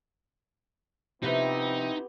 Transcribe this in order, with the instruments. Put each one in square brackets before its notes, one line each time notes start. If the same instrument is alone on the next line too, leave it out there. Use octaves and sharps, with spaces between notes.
[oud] C3 F3 B4 [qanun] B3 G4 [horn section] C4 E4 [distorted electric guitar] D#4